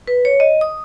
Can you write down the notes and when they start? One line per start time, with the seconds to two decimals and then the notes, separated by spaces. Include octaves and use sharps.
0.08 B4
0.25 C#5
0.40 D#5
0.61 D#6